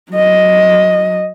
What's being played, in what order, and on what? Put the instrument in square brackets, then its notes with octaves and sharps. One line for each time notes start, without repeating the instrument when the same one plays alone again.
[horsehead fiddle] F#3 D#5